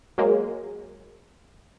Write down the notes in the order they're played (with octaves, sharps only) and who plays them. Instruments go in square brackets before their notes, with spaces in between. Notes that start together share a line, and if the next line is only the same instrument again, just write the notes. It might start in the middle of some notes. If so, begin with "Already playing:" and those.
[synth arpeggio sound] F#3 G#3 A#3